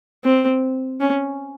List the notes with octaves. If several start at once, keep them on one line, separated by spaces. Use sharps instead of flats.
C4
C#4